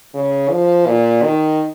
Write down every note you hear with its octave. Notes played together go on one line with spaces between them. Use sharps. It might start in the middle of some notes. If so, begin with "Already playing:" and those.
C#3
F3
A#2
D#3